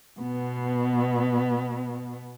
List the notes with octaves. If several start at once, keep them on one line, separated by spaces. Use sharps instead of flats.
B2 B3